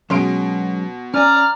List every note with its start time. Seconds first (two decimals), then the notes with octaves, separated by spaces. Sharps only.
0.10 B2 F#3 G#3 C#4 C6 D7
1.14 C#4 D5 G#5 A#5 F6